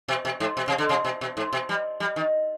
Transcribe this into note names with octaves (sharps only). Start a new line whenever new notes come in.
B2
B2
G#2
B2
C3
D3
C3
B2
B2
G#2
B2
G3
G3
D#3